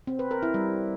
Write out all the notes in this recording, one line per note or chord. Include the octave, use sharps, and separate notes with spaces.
C4
B4
A#4
E4
G3